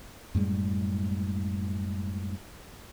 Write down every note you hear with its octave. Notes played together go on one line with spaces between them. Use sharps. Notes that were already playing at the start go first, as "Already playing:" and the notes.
F#2 A2 G3 G#3